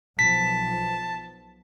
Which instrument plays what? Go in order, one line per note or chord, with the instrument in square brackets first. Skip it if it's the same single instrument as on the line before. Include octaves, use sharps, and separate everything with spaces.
[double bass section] B1 F3 [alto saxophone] A5 [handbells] B6